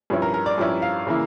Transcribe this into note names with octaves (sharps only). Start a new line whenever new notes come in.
G2 F3 C#4 E4
A#4
A#4
D5
G2 F3 C#4 E4
F5
C#3 E3 A#3 E4